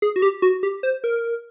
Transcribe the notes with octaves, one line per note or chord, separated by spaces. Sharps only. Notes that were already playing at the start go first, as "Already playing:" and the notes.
G#4
F#4
G4
F#4
G4
C5
A#4